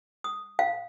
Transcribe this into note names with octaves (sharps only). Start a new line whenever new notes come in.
D#6
F5